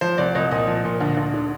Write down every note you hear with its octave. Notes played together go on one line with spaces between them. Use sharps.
F3 C5
C2 D5
C2 D#5
A#2 D#5
F3
A#2
D2
D2
D3